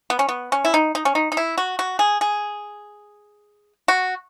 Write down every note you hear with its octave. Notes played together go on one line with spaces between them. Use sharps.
B3
C#4
B3
C#4
E4
D#4
D#4
C#4
D#4
D#4
E4
F#4
F#4
G#4
G#4
F#4